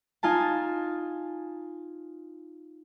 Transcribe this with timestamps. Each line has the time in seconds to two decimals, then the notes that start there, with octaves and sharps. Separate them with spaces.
0.23 D#4 F4 G#5 A5